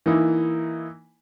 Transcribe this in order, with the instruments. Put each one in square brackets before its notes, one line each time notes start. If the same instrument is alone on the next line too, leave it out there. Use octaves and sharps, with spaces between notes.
[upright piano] E3 A#3 D#4 E4